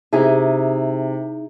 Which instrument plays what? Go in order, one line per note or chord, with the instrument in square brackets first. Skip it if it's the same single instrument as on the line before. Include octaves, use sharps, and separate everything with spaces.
[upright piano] C3 [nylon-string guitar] D#4 E4 G#4